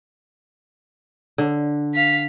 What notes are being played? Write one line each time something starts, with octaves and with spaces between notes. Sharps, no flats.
D3
F5 B6